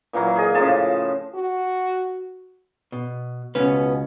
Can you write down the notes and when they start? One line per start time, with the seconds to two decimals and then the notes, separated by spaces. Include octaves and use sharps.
0.13 A#2 E3 F#3 A#3
0.36 G#4 D#5
0.55 A2 C#3 F3 A5
1.35 F#4
2.92 B2
3.55 C#2 B2 B3 C#4 B4